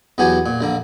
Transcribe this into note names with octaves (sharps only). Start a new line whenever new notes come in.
E2 F#3 B3 F#4 G4 G#5
A#2
A#1 D3 A#3